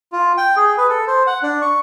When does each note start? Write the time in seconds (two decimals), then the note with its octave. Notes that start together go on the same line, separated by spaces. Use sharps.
0.12 F4
0.37 G5
0.56 G#4
0.78 B4
0.90 A4
1.07 C5
1.27 F#5
1.43 D4
1.62 C#6